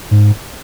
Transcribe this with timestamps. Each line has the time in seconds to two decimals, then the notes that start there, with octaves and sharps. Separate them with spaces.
0.11 G#2